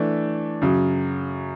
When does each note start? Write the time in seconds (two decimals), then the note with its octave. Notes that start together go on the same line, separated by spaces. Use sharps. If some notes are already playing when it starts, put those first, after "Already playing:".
Already playing: E3 A3 D4
0.62 F#2 C#3 F#3